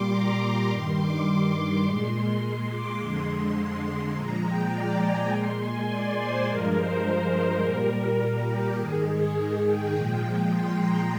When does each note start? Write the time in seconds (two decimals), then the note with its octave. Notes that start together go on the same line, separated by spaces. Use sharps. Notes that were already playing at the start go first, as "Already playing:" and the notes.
Already playing: A#2 G3 C6 D6
0.11 A#5
0.41 D6
0.69 G2 D#3 G3 C6
0.98 D6
1.56 C6
1.85 A#2 G#3
2.71 D6
3.00 F2 D3 G#3 C6
3.29 C6
4.15 A#2 F3 G#3 A#5
4.44 G5
4.73 D5
5.02 G#5
5.31 A#2 G#3 C6
5.60 G#5
5.89 D5
6.17 C5
6.47 G2 F3 G#3 A#4
6.75 C5
7.62 A#2 G3 A#4
8.48 G4
8.77 G#2 D#3 G#3 G#4
9.06 G#4
9.36 G#4
9.63 G5
9.93 A#2 F3 G#3
10.51 C6
10.79 A#5